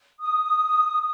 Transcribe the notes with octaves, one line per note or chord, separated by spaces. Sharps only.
D#6